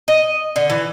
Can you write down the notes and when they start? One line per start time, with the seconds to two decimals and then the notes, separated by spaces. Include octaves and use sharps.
0.08 D#5
0.56 D3
0.70 E3